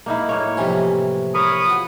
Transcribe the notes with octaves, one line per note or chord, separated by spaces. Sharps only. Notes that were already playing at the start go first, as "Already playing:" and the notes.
A#3 D#4 E4
A2 A#3 C#5
C3 E3 F3 C#4
A#4 C#5 B5 C#6 D#6
F4 F#4